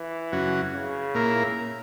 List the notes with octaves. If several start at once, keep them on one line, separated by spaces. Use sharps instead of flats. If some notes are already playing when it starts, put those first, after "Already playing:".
Already playing: E3
F#2 C#3 F#3 C#4 F#4
C#3
A#2 A#3 E4 A#4